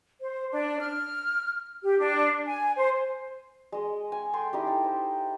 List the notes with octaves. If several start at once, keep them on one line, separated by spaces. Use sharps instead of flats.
C5
D4
F6
G4
D4
G#5
C5
G#3 D#5
G#5
A4 G5 G#5 C6
D#4 E4 G4
A4
C5